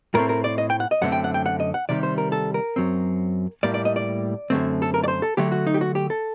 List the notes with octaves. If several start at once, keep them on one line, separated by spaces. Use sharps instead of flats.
A2 A3 C4 A#4
A#4
D5
D#5
G5
F#5
D#5
F#2 D3 A3 C4 F#5
G5
F#5
G5
F#5
D#5
F#5
C3 D#3 G3 D5
C5
A#4
A4
A#4
F#2 F#3 C4
A2 G3 A#3 D5
D5
D#5
D5
F#2 D3 A3 C4
A4
A#4
D5
C5
A4
D3 F#3 A3 G4
F#4
D#4
G4
F#4
G4
A4